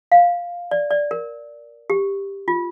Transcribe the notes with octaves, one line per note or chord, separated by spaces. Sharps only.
F5
D5
D5
A#4
G4
F4